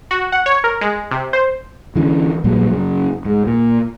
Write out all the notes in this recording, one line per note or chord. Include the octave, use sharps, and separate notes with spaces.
F#4
F#5
C#5
A#4
G#3
C3
C5
D3 E3 A#3 C#4
A#1 A#2 F#3 G3
F#2 C#3
G#2
A#2